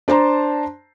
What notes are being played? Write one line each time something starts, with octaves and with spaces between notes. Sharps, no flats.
D4 C5 A5 A#5 C6